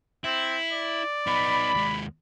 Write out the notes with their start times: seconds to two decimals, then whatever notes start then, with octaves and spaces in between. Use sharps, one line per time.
0.24 C4 E4
0.73 D5
1.27 B3 D#4 B5
1.74 D#2 G#3